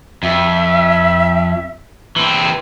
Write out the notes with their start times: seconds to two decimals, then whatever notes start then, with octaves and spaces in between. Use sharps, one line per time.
0.23 F2 E5
2.16 E3 C4